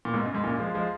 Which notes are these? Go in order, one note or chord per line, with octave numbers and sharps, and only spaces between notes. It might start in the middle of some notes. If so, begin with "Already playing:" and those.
A#2
G#2 B2
F#2
G#2
F#2 A#2
F3 G#3
F3 G#3